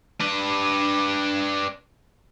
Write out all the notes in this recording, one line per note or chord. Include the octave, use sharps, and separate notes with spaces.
D4 B4